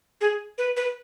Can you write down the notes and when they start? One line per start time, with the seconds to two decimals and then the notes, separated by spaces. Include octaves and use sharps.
0.21 G#4
0.58 B4
0.77 B4